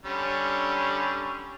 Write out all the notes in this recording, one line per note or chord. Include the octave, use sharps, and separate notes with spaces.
D3 G3 C#4